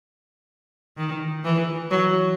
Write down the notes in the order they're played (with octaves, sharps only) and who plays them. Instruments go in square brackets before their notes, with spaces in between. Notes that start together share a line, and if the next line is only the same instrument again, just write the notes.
[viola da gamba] D#3
E3
F#3